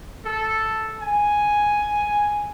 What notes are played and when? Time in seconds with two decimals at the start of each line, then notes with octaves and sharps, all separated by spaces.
0.25 A4
1.00 G#5